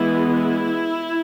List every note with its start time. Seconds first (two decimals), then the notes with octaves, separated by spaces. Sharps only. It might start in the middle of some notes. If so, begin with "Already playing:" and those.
Already playing: E3 G#3 B3 E4
0.32 E4